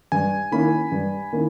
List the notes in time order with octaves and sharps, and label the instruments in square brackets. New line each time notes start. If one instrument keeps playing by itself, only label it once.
[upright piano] G2 [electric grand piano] G#5
[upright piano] D#3 A#3 C#4 E4 [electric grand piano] B5
[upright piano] G2
D#3 A#3 C#4 E4